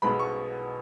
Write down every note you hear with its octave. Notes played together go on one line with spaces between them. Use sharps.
B1 B2 G#3 B3 B5
C#6